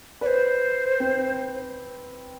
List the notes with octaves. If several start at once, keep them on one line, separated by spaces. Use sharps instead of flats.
B4 C5 D5
C4